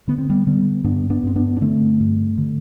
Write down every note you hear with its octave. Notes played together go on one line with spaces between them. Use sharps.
D3 B3
C4
G3 B3
D3 G3 B3
G2 B3 D4
B3 D4
G2 C4
B3 D4
D4
D3 A3 C4
G2
D3